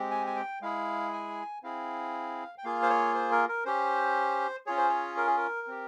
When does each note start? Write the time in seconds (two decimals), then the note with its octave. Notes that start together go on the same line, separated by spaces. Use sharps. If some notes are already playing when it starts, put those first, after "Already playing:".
Already playing: G#3 C4 G4
0.11 G#5
0.27 G#5
0.36 G5
0.62 G#3 E4 G#4 F5
1.13 G#5
1.63 C4 E4 G#4 F5
2.58 G5
2.64 A#3 F4 G#4 F5
2.82 C5
2.90 C#5
3.15 C5
3.32 A#4
3.49 A#4
3.65 C#4 G4 C5
4.66 C#4 F4 G#4 C#5
4.77 C5
4.89 C#5
5.17 A#4
5.27 G#4
5.37 A#4
5.67 C4 G4